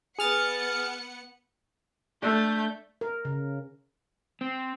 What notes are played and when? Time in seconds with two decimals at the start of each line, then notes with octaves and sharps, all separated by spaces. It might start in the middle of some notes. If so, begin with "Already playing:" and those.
0.19 B3 G#4 F#5 F6 A6 C#7
2.23 A3 D4 A4 G6
3.01 A#4
3.25 C#3
4.41 C4